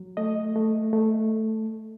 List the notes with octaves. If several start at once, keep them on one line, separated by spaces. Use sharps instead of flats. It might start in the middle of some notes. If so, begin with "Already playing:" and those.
Already playing: F#3
A3 D#5
A3
A3